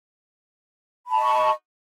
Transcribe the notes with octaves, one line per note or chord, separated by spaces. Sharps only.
D#5 A5 B5 C#6